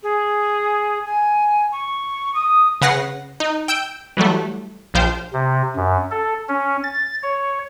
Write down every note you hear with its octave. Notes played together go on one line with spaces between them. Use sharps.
G#4
G#5
C#6
D#6
C#3 B4 F#5 A#6 C7
D#4
G5 E6 G6 D7
E3 F#3 G3 A3
A#1 F3 C5 F5 G5
C3
F#2
A4
C#4
A6
C#5